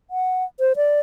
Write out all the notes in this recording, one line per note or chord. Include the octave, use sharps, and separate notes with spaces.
F#5
C5
D5